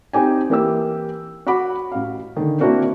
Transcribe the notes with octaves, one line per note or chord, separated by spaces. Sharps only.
C4 D#4 G4 G#5
E3 A#3 G4 E6
F#4 F#5 B5 D6
A1 F5
D3 D#3
A#3 C4 D4 E4 F#4 A#4